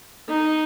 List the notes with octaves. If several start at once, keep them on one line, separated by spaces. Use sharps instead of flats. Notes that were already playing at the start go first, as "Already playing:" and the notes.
D#4